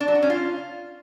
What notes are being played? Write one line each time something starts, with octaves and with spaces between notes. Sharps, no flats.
D4
F#3
F#4
C#4
F4